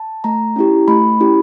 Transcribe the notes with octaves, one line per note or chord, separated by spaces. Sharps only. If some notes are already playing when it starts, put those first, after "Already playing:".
Already playing: A5
A3 A#5
C#4 E4 G4
A3 B5
C#4 E4 G4